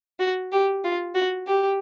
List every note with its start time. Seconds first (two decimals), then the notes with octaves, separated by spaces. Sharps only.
0.19 F#4
0.52 G4
0.84 F4
1.15 F#4
1.47 G4